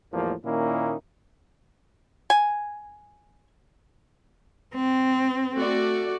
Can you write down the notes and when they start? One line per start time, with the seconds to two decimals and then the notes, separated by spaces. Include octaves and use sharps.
0.12 E2 A2 F3 G3 A#3
0.45 A#2 D#3 A#3 C#4 D#4 E4
2.30 G#5
4.75 C4
5.55 A3 F#4 D5